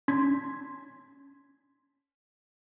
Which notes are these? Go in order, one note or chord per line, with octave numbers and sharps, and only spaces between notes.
C#4 D4 C6 G#6 B6